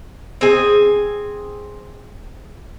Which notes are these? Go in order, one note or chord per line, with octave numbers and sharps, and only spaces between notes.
C4 G#4 G#5